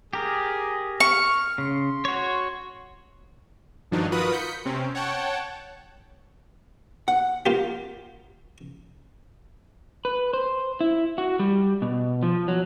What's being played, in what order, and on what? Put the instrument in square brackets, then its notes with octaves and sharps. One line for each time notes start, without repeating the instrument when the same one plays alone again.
[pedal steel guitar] G4 A#4 [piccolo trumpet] G#4
[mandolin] C#6 [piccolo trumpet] F6
[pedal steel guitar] C#3 [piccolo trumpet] C6
[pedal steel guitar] F#4 C#5
[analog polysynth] G2 D#3 F3 F#3 D4 D#4
F4 F#4 A#4 B4 B5 D#6
G6 B6 C#7
C3 C4 C#4
C#5 F#5 G5 A5
[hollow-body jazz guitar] F#5
[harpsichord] A#3 F4 G4
[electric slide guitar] B4
C5
E4
F#4
G3
B2
F3
F#3